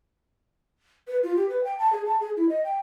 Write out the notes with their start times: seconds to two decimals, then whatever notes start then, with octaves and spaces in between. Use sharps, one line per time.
1.08 B4
1.23 F4
1.36 G4
1.49 B4
1.64 G5
1.79 A5
1.93 G#4
2.06 A5
2.20 G#4
2.37 E4
2.49 D#5
2.64 G5